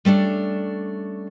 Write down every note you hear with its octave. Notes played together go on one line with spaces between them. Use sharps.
G3 A3 C#4 D4